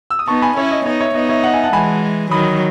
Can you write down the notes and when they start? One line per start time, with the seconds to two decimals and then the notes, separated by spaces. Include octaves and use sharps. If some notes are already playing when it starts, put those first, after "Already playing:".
0.10 E6
0.19 D#6
0.28 B3 D#4 A5 C#6
0.42 G#5 B5
0.57 C#4 E4 C#5 E5
0.71 D#5
0.86 B3 D#4 C#5
1.01 C#5 E5
1.15 B3 D#4 D#5
1.29 C#5 E5
1.44 D#5 F#5
1.54 E5 G#5
1.64 F#5 A5
1.73 E3 G#3 G#5 B5
2.31 D#3 F#3 B5 D#6